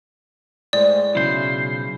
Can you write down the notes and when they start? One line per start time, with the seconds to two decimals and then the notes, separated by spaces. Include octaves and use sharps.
0.73 A2 G#3 C5 D5
1.15 B1 C#3 E4 F#4 C5